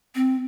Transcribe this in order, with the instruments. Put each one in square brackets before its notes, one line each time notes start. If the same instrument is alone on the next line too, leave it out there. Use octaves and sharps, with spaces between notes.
[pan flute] C4